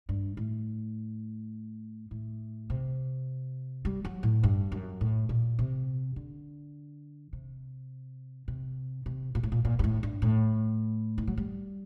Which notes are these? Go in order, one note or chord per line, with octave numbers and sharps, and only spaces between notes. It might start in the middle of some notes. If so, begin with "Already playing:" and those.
G2
A2
A2
C3
G3
F#3
A2
G2
F#2
A2
A#2
C3
D3
C3
C3
C3
A#2
A2
A#2
A#2
G2
A2
G2
A2
D#3
F#3
G3